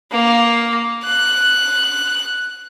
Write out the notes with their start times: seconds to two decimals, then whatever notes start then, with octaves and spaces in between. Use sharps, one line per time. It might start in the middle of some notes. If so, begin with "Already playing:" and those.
0.11 A#3
1.04 F#6